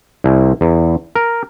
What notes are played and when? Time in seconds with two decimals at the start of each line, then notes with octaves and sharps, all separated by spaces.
0.24 C2
0.61 E2
1.16 A#4